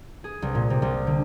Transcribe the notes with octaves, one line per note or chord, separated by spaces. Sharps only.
G#4
C2
A#2
C3
C2
D3